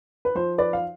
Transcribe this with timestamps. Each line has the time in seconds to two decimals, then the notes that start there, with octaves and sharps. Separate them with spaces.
0.25 B4
0.35 F3 C5
0.58 B4 D5
0.73 F5